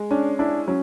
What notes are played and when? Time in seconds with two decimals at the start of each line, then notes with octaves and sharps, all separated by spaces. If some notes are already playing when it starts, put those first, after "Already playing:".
Already playing: G#3
0.11 C#4 D4
0.39 D4 E4
0.67 F#3 C#4